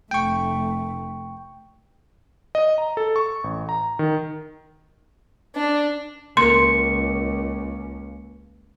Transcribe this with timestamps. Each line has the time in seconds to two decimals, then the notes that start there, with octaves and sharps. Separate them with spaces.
0.11 F1 A3 G5 C#6
2.55 D#5
2.78 A#5
2.97 A4
3.16 C#6
3.44 A1
3.69 A#5
3.99 D#3
5.56 D4
6.37 C#2 A#3 A#4 C6 C#7